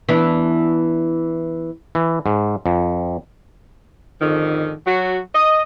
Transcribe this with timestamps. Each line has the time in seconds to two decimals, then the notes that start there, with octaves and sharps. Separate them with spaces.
0.09 E3 B3 D4
1.95 E3
2.26 G#2
2.66 F2
4.20 F2 G#2 D3 D#3
4.86 F#3 F#4
5.34 D#5